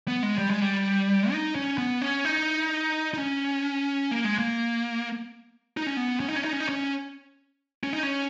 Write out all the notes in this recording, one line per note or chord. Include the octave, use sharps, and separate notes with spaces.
B3
G#3
G3
G#3
G3
D#4
C#4
B3
C#4
D#4
D#4
C#4
A#3
G#3
A#3
D#4
C#4
B3
C#4
D#4
C#4
D#4
C#4
D#4
C#4
C#4
D#4
C#4